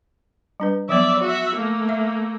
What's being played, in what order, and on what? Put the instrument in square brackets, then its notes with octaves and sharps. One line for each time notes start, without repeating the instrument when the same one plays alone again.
[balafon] G3 D4 B4
[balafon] F3 F#3 B3 [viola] D5 E5
[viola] F#4 E5
A3 A#3
[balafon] E5